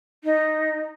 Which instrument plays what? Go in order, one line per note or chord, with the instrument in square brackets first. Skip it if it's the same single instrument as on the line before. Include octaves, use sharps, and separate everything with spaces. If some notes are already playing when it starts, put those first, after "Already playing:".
[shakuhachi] D#4